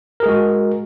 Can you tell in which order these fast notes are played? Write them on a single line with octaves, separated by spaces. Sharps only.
A#4 G#4 G#3 F#4